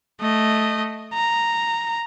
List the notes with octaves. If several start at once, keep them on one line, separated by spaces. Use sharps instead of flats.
A3 D#5
A#5